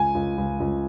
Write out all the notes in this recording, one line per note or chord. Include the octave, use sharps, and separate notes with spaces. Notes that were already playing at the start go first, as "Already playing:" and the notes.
Already playing: C#2 G#5
C#2
C#2
C#2